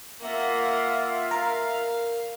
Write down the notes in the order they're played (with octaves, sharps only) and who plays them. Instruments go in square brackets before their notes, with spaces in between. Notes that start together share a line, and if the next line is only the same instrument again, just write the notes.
[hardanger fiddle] A#3 F#5 [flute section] F4 E5
[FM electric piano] A#4 [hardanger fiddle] F5